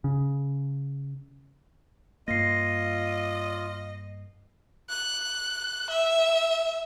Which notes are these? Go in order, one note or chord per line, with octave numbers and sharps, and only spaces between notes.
C#3
G2 A#3 F4 D#5 A#6 C7
F#6
E5